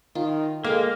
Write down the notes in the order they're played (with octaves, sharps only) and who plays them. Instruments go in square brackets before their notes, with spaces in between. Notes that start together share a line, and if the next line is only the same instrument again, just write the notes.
[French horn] D#3 [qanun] F4
[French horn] G#3 [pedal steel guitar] A#3 [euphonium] A4 [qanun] F5 G5